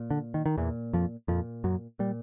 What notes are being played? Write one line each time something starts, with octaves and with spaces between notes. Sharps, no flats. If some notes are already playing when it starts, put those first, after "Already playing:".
Already playing: A#2
D3
D#3
D#3
E2 A#2 E3
F2 F3
F2 A#2 F3
F#2 F#3
A#2 G3